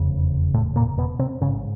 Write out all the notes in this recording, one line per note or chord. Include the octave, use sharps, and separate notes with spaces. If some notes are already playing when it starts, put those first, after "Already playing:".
Already playing: F1 E2 C#3
A2 A3
A#2 A#3
B2 B3
C3 C4
A1 G#2 C#3 C#4